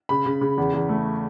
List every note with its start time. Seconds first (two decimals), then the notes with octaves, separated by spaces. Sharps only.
0.09 C#3 B5
0.26 C#3
0.41 C#3
0.58 E2
0.74 E2
0.89 A3